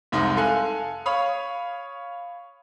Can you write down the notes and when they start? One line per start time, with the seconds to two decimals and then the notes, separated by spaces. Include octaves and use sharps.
0.12 F1 C2 G#3 D#4
0.37 A4 F5 G#5 F#6
1.06 C#5 F5 B5 D#6